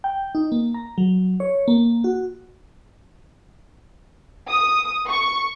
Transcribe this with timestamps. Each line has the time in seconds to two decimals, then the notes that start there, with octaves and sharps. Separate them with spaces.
0.04 G5
0.35 D#4
0.52 A#3
0.74 A#5
0.98 F#3
1.40 C#5
1.68 A#3
2.04 F#4
4.48 D#6
5.09 C#6